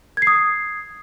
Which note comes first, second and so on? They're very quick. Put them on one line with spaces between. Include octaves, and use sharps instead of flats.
G#6 C7 D#6